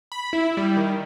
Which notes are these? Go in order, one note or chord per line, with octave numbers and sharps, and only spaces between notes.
B5
E4
G3
D#3